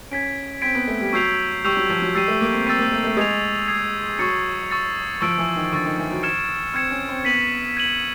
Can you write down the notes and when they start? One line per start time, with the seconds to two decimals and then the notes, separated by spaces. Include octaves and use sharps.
0.11 C#4 G#6 B6 D7
0.62 C4 G#6 B6 D7
0.75 B3
0.88 A3
1.01 G3
1.13 F#3 C#6 E6 G6 C7 F7
1.64 G3 C#6 E6 G6 C7 F7
1.77 F#3
1.90 F3
2.02 F#3
2.15 G3 E6 A6 C7 D#7
2.28 A3
2.41 A#3
2.54 C4
2.67 C4 E6 A6 C7 D#7
2.79 A#3
2.92 A3
3.04 A3
3.17 G#3 D#6 G#6 C7 F7
3.68 D#6 G#6 C7 F7
4.19 F#3 C#6 E6 A6 C#7
4.70 C#6 E6 A6 C#7
5.21 F3 C#6 E6 A6 D7
5.38 E3
5.55 D#3
5.73 D3 C#6 E6 A6 D7
5.85 D#3
5.98 E3
6.11 F#3
6.23 F6 G#6 C#7 E7
6.74 C4 F6 G#6 C#7 E7
6.91 C#4
7.09 C4
7.25 B3 G#6 B6 D#7 F#7
7.77 G#6 B6 D#7 F#7